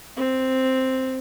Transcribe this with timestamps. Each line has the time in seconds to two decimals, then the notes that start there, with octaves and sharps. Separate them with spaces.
0.17 C4